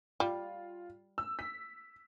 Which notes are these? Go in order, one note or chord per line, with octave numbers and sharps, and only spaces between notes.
G3 F4
E6
B6